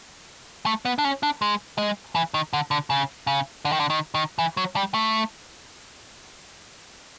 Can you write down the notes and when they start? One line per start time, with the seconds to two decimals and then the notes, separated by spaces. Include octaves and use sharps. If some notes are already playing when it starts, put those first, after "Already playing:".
0.66 A3
0.85 B3
0.98 D4
1.04 C#4
1.23 D4
1.42 G#3
1.78 G#3
2.15 E3
2.34 D#3
2.53 D3
2.71 D3
2.90 C#3
3.27 C#3
3.65 D3
3.72 D#3
3.80 D3
3.90 D#3
4.14 D#3
4.39 E3
4.57 F#3
4.76 G3
4.94 A3